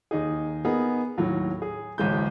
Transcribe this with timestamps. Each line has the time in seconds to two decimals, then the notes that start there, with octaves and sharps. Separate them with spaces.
0.11 D#2 D#4 G#4
0.65 B3 D#4 G#4 A#4
1.17 D#2 A2 F#3
1.62 G#4
1.98 D1 A1 G#3 G6